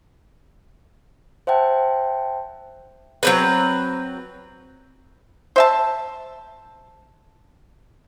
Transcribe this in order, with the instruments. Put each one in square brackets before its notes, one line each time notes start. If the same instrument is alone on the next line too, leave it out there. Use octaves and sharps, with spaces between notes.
[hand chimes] C5 E5 F#5 G5 A5
[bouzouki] F#3 C4 B4
[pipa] C5 E5 A5